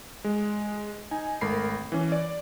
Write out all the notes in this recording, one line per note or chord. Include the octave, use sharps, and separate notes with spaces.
G#3
D#4 G#5
G#1 A3 A#4 B5 C7
E3 C#4
D5